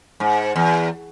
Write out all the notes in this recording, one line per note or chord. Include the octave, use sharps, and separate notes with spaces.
G#2
E2